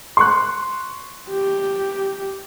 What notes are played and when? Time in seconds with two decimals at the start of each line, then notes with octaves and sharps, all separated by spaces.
0.17 C6 C#6 F#6
1.30 G4